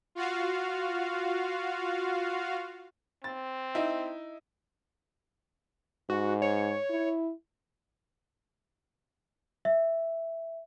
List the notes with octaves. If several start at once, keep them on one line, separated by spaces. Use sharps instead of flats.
F4 F#4 F5
C4 A6
D#4 E4
G#2 F#4
C#5
E4
E5